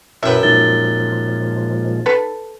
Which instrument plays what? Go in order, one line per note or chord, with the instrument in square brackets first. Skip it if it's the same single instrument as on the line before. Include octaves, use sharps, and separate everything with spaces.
[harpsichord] F#2 G5 [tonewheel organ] E4 [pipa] B4 E5
[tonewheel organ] A#2 F3 G#3 [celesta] D#4 A6 G7
[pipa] A4 B4